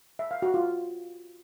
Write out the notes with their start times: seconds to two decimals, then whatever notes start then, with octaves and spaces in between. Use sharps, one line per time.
0.19 E5
0.31 F5
0.42 F#4
0.54 F4